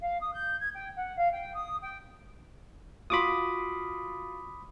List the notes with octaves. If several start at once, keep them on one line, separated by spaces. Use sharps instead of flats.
F5
D#6
G6
G#6
G5
F#5
F5
G5
D#6
G5
F4 F#4 B5 C6 D6 D#6